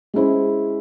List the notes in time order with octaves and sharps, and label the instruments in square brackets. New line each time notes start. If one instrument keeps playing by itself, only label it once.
[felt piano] G#3 C#4 E4 G#4 C5